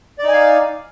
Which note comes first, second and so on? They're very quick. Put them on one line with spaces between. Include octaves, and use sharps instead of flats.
D5 D#4 G#5 F5